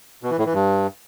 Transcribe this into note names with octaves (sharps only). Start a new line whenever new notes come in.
B2
E3
A2
E3
G2